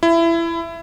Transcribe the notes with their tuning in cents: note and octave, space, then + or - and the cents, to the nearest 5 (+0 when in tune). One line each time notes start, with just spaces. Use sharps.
E4 +20